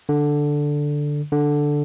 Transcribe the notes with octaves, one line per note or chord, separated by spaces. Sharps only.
D3
D3